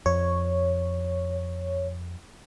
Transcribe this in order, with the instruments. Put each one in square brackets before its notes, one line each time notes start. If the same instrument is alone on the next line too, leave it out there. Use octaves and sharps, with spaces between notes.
[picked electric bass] F2 [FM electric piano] C#5